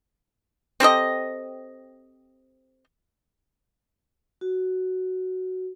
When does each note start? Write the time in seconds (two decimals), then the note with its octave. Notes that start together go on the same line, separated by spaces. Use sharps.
0.80 C4 G4 A4 D#5
4.41 F#4